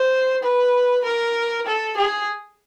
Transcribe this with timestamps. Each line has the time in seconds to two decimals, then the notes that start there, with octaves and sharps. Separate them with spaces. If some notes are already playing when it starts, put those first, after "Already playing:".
Already playing: C5
0.43 B4
1.04 A#4
1.66 A4
1.96 G#4